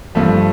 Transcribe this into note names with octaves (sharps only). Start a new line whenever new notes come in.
G2 F3 A3